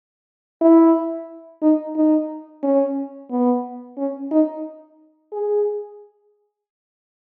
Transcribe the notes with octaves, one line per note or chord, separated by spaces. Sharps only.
E4
D#4
D#4
C#4
B3
C#4
D#4
G#4